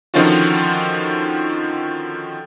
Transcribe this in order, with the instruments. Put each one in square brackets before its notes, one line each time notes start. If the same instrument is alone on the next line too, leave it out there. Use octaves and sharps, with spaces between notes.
[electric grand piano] D3 D#3 F3 C#4 F4 F#4